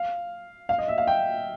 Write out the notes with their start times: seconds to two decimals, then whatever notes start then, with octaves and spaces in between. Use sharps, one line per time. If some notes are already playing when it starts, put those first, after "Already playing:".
Already playing: F5
0.69 F5
0.78 D#5
0.88 E5
0.98 F5
1.07 G5